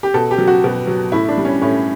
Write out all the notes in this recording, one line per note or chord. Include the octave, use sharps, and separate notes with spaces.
G4
B2 A4
G4
F#3
F#4
B2
F#3
A2 E4
D4
G3
C#4
A2 C#4